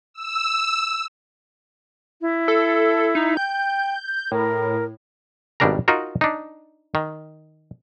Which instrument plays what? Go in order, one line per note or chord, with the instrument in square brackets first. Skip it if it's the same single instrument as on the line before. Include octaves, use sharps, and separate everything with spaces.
[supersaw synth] E6
[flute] E4
[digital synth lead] A4
D#4
[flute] G5 [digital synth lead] G6
[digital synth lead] A2 [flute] A#4
[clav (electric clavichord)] G#1 B2 G3 D4 A#4 A#5
D#4 F4 F#4 A#4
D4 D#4
D#3